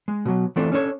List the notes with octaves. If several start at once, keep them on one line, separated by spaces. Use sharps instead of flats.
G#3
B2 F#3
E3 A3 C4 D4 F4 A4
C#4 D4 A4 B4 C#5